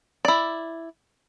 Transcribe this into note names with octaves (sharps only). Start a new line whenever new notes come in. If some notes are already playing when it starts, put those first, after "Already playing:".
E4 D5